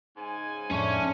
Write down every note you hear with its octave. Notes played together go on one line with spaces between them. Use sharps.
G#2 C#3 G#5
F2 A2 A3 C#4 D4 C#5